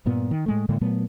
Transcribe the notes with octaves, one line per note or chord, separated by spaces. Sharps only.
G2 A#2 B3
D#3
A2 G#3 A3
A2 D3 G#3 A#3
A#2 F#3 A3 B3